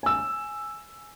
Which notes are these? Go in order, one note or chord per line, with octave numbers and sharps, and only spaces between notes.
G#5 E6